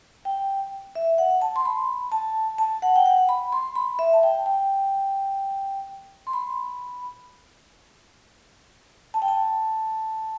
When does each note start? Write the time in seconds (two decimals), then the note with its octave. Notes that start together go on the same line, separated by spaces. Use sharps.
0.25 G5
0.95 E5
1.18 F#5
1.42 A5
1.56 C6
1.65 B5
2.12 A5
2.58 A5
2.82 F#5
2.96 G5
3.06 F#5
3.29 B5
3.52 C6
3.75 B5
3.99 E5
4.13 A5
4.23 G5
4.46 G5
6.27 C6
6.33 B5
9.14 A5
9.22 G5
9.28 A5